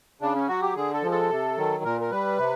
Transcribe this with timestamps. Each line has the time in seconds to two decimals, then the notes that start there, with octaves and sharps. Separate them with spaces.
0.21 C#3 D4
0.35 C#4
0.48 F#3 F#4
0.62 G4
0.75 D3 G#4
0.94 A4
1.03 F3 G#3
1.11 A4
1.30 C3
1.57 D#3 F#3
1.84 A#2 A#4
2.01 A#4
2.11 G3 B4
2.38 C3